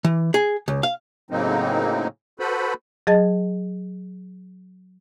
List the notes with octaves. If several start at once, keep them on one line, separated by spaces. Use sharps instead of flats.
E3
G#4
C#2
F5
A2 C#3 F#3 A#3 C4 D#4
F#4 A4 B4 C5 B5
F#3 G#4 D#5 A5 A6